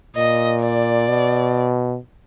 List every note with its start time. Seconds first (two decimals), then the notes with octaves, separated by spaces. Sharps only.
0.16 A#2 D#5
0.62 D5
1.08 B2